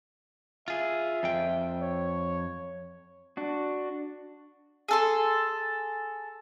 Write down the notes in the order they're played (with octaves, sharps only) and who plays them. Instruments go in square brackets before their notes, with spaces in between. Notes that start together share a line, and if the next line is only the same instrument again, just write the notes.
[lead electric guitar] F4 G#4 [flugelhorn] E5
[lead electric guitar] F2 G5
[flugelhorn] C#5
[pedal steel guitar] D4 F#4
[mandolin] G#4 A4 C6